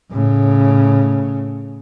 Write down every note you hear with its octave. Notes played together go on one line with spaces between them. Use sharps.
A2 C#3